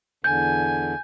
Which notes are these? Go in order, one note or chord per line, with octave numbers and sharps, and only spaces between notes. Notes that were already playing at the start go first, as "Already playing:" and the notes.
E2 D3 G#5 G6